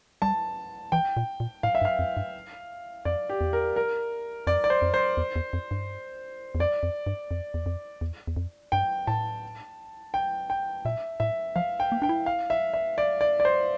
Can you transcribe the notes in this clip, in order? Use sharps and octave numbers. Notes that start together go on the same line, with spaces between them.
G3 A5
E3 G5
A#2
A#2
A2 F5
E5
G2
F5
F2
G2
F2 D5
G4
E2
A#4
A#4
F2 D5
D5
C5
F2
C5
E2
E2
F2
G2
E2
F2 D5
F2
G2
F2
E2
F2
E2
E2
F2
G2 G5
A2 A5
G5
G5
A#2 E5
A2 E5
F3 F5
G5
A#3
D4 G5
E4
F5
E5
E5
D5
D5
D5
C5